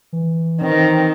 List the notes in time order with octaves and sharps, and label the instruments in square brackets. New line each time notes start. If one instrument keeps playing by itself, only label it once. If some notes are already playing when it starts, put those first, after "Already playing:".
[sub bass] E3
[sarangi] D#3 [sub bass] E3 [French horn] C4